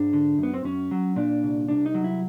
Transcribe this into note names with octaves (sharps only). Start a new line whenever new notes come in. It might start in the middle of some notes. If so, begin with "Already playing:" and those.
Already playing: G#2 D4
D3
F#2
B3
C4
F#2 C#4
F#3
A#2 D4
C2
C2 D4
D#4
F#3
E4